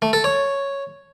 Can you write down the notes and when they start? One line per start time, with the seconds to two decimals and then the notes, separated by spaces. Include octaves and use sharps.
0.02 A3
0.13 A4
0.24 C#5